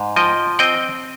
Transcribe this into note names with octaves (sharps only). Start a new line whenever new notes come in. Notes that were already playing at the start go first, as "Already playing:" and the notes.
Already playing: G#2
F3 D#5 G5
C4 D#5 G5